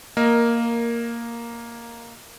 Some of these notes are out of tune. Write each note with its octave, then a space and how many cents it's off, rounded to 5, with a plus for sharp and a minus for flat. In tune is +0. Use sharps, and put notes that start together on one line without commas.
A#3 +0 A#4 +5 D#5 +0